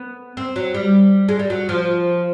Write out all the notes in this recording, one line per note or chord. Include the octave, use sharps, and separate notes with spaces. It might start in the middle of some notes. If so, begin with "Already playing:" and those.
Already playing: B3
C4
F#3
G3
G#3
G3
F#3
F3